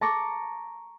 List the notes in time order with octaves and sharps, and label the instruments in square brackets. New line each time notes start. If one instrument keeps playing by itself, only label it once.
[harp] A5 A#5 C#6 D6 A6